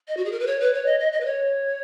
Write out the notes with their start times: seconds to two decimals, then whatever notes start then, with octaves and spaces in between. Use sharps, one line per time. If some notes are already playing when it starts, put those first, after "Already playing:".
0.08 D#5
0.17 F#4
0.25 G#4
0.32 A#4
0.40 B4
0.47 C#5
0.60 B4
0.74 C#5
0.86 D#5
1.00 D#5
1.13 D#5
1.21 B4
1.25 C#5